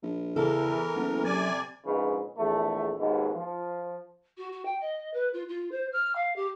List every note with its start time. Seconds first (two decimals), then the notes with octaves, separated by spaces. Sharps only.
0.02 A#1
0.36 E2 C#3 E3 A4 A#4
0.96 F#1 B3
1.24 C3 F#3 D5 G#5
1.86 A#1 G#2 C#3 B4
2.37 A#1 E2 A3
2.99 D#2 G#2 B2
3.34 F3
4.37 F#4
4.52 F#4
4.65 G5
4.80 D#5
5.13 B4
5.33 F4
5.48 F4
5.71 C5
5.92 F6
6.15 F5
6.36 G4